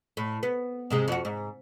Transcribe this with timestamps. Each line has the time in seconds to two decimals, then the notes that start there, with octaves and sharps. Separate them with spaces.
0.17 A2
0.43 B3
0.90 G#2 C3 G#3
1.08 F2 F#4
1.25 G#2